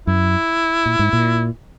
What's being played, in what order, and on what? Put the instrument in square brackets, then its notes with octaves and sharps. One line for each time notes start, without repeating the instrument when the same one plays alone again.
[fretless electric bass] F#2 [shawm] E4
[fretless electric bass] A#2
G#2
A#2